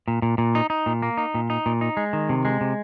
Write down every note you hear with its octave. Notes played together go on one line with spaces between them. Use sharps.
A#2
A#2
A#2
D#4
D#4
A#2
A#3
D#4
A#2
D#4
A#2
D#4
G#3
D#3
C3
G#3
C3